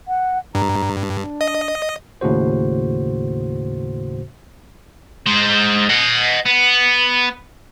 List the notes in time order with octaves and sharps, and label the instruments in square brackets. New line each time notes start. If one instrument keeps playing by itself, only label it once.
[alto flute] F#5
[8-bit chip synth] G2 [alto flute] A#5
[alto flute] D4
[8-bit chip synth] D#5
[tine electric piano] D#2 A2 C#3 F#4 C5
[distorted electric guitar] G#3 C5
D#5 F#5
B3